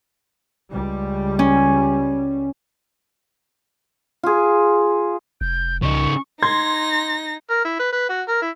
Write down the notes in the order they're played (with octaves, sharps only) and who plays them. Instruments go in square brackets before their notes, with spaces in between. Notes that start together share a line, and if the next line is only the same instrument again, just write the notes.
[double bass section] C#2 G3
[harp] C#4
[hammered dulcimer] F4 G#4
[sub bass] F1 [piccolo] G6
[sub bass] C2 [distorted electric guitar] C#3 D#4 [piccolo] C#6
[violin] D#4 A#6 [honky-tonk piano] C6 G#6
[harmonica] A#4
E4
B4
B4
F#4
A#4
E4